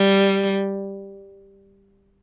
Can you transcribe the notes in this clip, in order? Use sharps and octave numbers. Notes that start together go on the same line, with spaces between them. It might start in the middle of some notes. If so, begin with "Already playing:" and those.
Already playing: G3